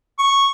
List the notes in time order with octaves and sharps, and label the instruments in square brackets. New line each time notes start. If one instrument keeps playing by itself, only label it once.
[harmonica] C#6